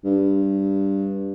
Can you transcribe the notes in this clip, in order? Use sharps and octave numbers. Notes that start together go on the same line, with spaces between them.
G2